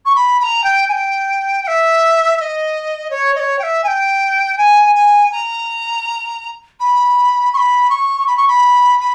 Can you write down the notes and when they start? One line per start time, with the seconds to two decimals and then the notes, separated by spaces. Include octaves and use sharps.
0.05 C#6
0.15 B5
0.39 B5
0.43 A#5
0.63 G5
0.88 G#5
0.92 G5
1.63 G5
1.67 E5
2.37 E5
2.41 D#5
3.10 C#5
3.35 D#5
3.39 C#5
3.58 G5
3.63 E5
3.83 G#5
3.87 G5
4.57 G#5
4.95 G#5
5.31 A#5
6.79 B5
7.53 C#6
7.57 B5
7.89 C#6
8.26 B5
8.37 C#6
8.48 B5
9.00 B5